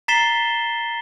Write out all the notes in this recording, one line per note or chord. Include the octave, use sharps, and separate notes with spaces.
A#5 A6 B6 C7 E7 G7